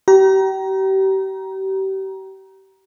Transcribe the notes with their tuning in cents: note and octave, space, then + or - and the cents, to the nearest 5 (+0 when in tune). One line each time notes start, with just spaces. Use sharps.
G4 -35 A#5 +20